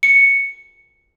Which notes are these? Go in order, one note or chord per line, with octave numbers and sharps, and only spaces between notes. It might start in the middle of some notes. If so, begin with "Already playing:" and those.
C#7